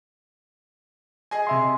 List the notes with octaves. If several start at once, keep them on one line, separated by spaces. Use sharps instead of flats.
G#4 D#5 G#5
C3 E5 C6